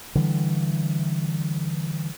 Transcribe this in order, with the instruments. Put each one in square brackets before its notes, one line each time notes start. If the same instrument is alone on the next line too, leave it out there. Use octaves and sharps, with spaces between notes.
[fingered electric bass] D3 E3 G3